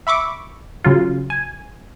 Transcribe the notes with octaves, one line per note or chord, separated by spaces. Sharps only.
E5 B5 C#6 D6
C#3 F#3 F4
G#5